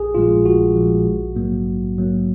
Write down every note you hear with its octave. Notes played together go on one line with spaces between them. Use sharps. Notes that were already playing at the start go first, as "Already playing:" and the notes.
Already playing: A#1 G#4
A#2 F3 G#3 F4
A#1 F#4
A#2 F3 G#3
A#1
G#2 F#3 A#3
A#1
G#2 F#3 A#3